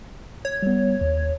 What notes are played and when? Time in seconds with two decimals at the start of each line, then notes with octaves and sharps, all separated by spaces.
0.45 C#5
0.62 G3 B3
1.01 D#2